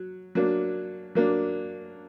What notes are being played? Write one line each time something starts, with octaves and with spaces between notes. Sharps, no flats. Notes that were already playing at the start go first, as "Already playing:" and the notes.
Already playing: F#3
F#3 A#3 D4
F#3 A#3 D4